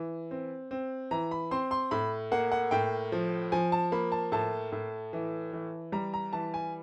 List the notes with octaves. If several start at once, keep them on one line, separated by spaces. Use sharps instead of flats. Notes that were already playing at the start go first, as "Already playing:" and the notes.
Already playing: E3
C4
C4
E3 A#5
B5
C4 C6
C6
A2 B5
A#3 F#5
F#5
A2 G5
F3
F3 G#5
A5
A#3 B5
A5
A2 A5
A2
E3
E3
G3 A#5
A#5
E3 A5
G#5